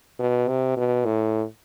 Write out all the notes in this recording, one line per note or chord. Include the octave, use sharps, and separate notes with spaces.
B2
C3
B2
A2